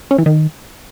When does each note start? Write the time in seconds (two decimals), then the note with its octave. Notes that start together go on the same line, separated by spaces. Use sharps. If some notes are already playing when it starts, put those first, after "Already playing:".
0.11 C#4
0.18 E3
0.26 D#3